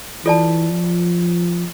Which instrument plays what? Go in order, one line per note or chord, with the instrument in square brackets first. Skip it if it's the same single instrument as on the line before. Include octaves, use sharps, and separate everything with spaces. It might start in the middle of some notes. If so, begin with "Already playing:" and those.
[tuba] E3 [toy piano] F4 A4 D5 A5
[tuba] F3